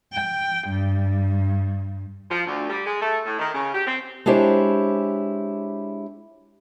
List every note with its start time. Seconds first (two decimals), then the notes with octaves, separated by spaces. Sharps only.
0.12 G5
0.68 G2
2.31 F3
2.46 D2
2.69 G3
2.86 G#3
3.02 A3
3.25 A2
3.39 D#3
3.54 C#3
3.74 G4
3.87 C4
4.26 G#3 D4 E4 G4 C5 C#5